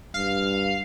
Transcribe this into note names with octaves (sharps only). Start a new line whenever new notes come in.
G2 F5